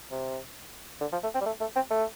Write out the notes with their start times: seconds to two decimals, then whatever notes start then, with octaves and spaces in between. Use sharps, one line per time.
0.11 C3
1.00 D3
1.12 F3
1.23 A3
1.34 C4
1.41 G3
1.46 A3
1.61 A3
1.75 C4
1.90 A3